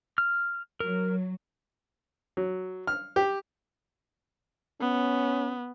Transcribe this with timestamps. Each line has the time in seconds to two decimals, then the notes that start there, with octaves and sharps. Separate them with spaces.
0.18 F6
0.80 F#3 A#4
2.37 F#3
2.87 F6
3.16 G4
4.80 B3 C#4